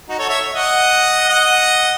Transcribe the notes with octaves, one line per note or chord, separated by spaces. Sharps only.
D#4 F#4
A4 C#5
C#5 E5
D#5 F#5
D#5 F#5